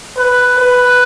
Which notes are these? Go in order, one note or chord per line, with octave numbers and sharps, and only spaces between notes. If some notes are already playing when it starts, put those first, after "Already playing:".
B4
B4